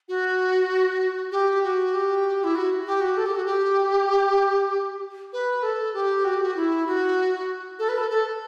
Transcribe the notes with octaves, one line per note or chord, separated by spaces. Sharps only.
F#4
G4
F#4
G4
E4
F#4
G4
F#4
A4
G4
F#4
G4
B4
A4
G4
F#4
G4
F#4
E4
F#4
A4
B4
A4
A4